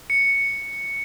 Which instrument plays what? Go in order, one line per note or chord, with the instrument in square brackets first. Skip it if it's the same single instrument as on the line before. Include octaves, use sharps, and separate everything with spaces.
[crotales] C#7